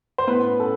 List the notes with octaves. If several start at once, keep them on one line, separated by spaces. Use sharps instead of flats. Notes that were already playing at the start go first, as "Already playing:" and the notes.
C5
A2 B3 B4
C#4
A4